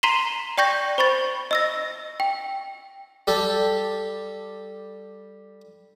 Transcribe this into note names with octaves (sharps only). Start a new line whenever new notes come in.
A#5 C6 B6 C7 E7 G7
D5 G5 C#6 G6 A#6
C5 B5 C#6 A6
D#5 E6 A#6
G5
G3 G4 A4